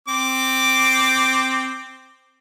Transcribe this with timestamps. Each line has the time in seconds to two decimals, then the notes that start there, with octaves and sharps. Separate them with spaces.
0.08 C4 D6